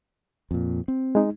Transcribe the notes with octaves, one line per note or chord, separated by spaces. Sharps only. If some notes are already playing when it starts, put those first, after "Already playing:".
F2 A#2
C4
G#3 D#4